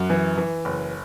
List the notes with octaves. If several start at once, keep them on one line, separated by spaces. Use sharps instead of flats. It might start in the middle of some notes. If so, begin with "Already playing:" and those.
Already playing: F#2
E3
E3
F#1